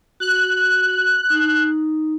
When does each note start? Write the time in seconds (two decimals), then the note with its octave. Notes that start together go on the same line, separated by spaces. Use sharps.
0.20 F#4 F#6
1.30 D#4